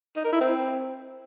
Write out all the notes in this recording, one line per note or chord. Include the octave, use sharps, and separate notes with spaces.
D#4
A#4
E4
C4